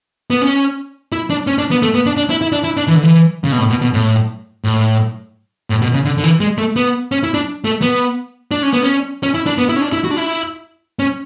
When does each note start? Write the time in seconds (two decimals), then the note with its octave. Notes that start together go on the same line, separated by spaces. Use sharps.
0.30 B3
0.42 C#4
1.12 E4
1.30 D4
1.47 C#4
1.58 D4
1.71 B3
1.82 A3
1.94 B3
2.06 D4
2.17 D4
2.30 E4
2.41 E4
2.52 D4
2.64 E4
2.77 D4
2.88 E3
2.96 D3
3.03 E3
3.44 C#3
3.52 B2
3.58 A2
3.70 B2
3.82 B2
3.94 A2
4.64 A2
5.70 A2
5.82 B2
5.93 C#3
6.05 D3
6.18 D3
6.24 E3
6.40 G#3
6.58 A3
6.76 B3
7.12 C#4
7.23 E4
7.34 D4
7.65 A3
7.82 B3
8.51 D4
8.63 C#4
8.73 B3
8.84 C#4
9.23 C#4
9.34 E4
9.46 D4
9.58 B3
9.69 E4
9.76 C#4
9.81 D4
9.93 E4
10.04 F#4
10.11 D4
10.17 E4
10.99 C#4